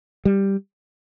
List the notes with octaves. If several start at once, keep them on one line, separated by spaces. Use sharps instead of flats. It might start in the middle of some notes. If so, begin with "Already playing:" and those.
G3